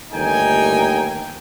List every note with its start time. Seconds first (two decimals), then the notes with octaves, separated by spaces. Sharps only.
0.13 G1 D#2 A3 D#4 G5 G#5